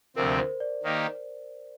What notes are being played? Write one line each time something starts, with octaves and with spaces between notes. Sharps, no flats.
D2 C3 F3 C4 A#4
C5
D5
D#3 A#3 D#4 G4